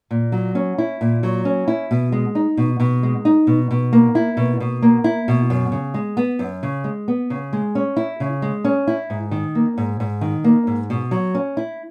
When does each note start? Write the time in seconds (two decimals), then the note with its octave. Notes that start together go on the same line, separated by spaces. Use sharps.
0.11 A#2
0.32 F#3
0.55 C#4
0.78 E4
1.01 A#2
1.23 F#3
1.45 C#4
1.68 E4
1.91 B2
2.12 G#3
2.35 D#4
2.57 B2
2.80 B2
3.03 G#3
3.25 D#4
3.47 B2
3.71 B2
3.93 A#3
4.15 E4
4.37 B2
4.60 B2
4.82 A#3
5.04 E4
5.28 B2
5.50 F#2
5.72 C#3
5.94 G#3
6.17 B3
6.39 F#2
6.63 C#3
6.84 G#3
7.08 B3
7.30 C#3
7.53 G#3
7.75 C#4
7.97 E4
8.20 C#3
8.42 G#3
8.65 C#4
8.87 E4
9.10 G#2
9.31 D#3
9.55 A#3
9.78 G#2
10.00 G#2
10.21 D#3
10.44 A#3
10.67 G#2
10.90 B2
11.11 F#3
11.35 C#4
11.57 E4